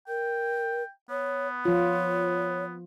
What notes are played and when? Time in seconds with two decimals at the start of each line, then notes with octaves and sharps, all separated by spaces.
0.08 A#4 G5
1.10 B3 C#5
1.65 F3 F4 C#5